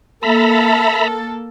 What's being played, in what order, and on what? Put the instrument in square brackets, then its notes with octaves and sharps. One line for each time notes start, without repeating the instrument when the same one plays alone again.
[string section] A#3 A4 [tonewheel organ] E5 A#5 B5